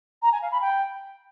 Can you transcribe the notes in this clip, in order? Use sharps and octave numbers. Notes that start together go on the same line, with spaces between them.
A#5
G#5
F5
B5
G5